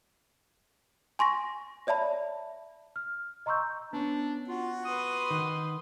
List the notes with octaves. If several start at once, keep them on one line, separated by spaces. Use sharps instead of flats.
G#5 C6 C#6 A#6
C#5 D5 E5 A5 B5
F6
D#5 A#5 C6 C#6 E6 G6
B3 C#4 D4
F4 F#4 F#5
B4 C6 D#6
D#3